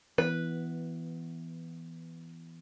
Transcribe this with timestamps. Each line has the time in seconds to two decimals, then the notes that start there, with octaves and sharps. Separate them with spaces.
0.18 E3 B3 B4